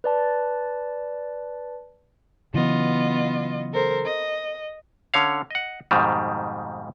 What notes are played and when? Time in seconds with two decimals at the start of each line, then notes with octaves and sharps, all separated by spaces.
0.04 B4 D5 A5
2.54 C#3 E3 F#3 B3 F4 D#5
3.72 A4 A#4 C5
4.06 D#5
5.14 D3 C#4 C#5 F5
5.51 D#5 F#5
5.91 F2 G#2 B2 D#3 G3